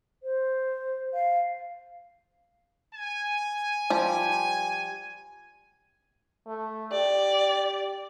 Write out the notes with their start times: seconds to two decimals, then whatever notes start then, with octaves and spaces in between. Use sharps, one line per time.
0.23 C5
1.14 F5
2.93 G#5
3.90 F3 G3 G4
6.47 A3
6.92 G4 D5